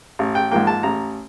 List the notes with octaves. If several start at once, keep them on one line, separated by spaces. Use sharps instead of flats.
A1
G5
G#2 F3 A#3 G5
A5
A1 A#5